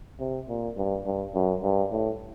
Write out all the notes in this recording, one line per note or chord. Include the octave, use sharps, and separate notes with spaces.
C3
A#2
G2
G2
F#2
G2
A2